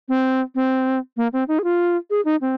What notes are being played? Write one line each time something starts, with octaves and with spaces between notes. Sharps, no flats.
C4
C4
A#3
C4
D#4
G#4
F4
G#4
D#4
C4